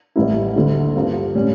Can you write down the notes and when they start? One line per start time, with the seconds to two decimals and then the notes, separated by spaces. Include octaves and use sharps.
0.16 A1 A2 G3 A#3 E4
0.56 D2 D3 A3 E4
0.96 G2 F3 A#3
1.35 A2 G3 C#4